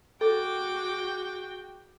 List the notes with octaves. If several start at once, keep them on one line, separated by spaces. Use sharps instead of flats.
F#4 G#4 A4 G5 D6